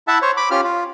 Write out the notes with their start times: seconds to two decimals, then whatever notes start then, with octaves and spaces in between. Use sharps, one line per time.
0.08 E4 E5 F#5 A5
0.22 C5 C#5
0.37 B5 D6
0.51 C#4 F4 G4 F6
0.64 F4